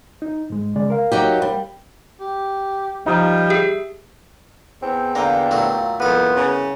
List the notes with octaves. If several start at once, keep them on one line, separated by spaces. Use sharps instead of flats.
D#4
G#2 G#3
C#3 G#3 D5
A#4 F5
F#3 D#4 G4
G3
G4
F3 G3 D#4
G4 G#4 E5
E2 C4
D3 A#3 F4 G5 A#5
A#2 F#3 A3
C2 F2 B3 D#5
C#3